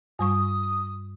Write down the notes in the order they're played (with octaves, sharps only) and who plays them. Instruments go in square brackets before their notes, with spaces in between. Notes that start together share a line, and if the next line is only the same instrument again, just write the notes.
[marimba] G2 G3 C#6 [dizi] D#6